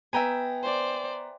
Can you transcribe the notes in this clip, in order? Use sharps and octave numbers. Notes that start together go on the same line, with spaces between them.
B3 E5 G5 G#5 A#5
C5 D5